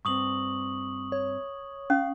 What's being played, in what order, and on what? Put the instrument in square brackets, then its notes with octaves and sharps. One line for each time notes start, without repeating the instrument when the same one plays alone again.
[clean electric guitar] G2 C4 [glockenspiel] C#6 D#6 F#7
[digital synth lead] C#5
[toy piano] C#4 [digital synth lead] F5